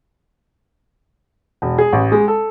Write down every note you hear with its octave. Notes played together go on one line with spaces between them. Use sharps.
E1
G#4
A1
G#3
A4